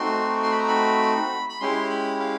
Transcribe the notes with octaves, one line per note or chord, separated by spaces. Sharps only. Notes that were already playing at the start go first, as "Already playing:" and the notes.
Already playing: A3 C4 D#4 F#4 C6
C6
B5
A#5
B5
B5
G#3 C#4 E4 G4 C6
B5
F5